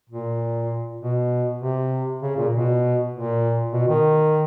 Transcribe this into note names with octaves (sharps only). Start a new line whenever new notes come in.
A#2
B2
C3
C#3
A#2
B2
A#2
B2
D#3